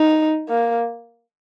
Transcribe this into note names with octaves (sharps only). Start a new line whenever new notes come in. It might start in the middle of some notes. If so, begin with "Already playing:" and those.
Already playing: D#4
A#3